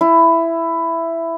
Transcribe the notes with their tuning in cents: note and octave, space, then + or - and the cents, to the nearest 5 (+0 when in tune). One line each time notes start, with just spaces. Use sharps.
E4 +10